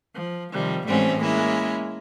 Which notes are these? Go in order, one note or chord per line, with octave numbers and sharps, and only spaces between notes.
F3
C3 D#3 F3 G3
A2 E3 G3 A3 C4 C#4
G#3 A#3 C#4 E4